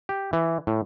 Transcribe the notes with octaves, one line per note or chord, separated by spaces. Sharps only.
G4
E3
A2